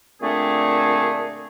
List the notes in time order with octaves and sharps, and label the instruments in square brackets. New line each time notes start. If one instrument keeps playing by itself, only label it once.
[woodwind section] A#2 D3 A3 C4 D4 G#4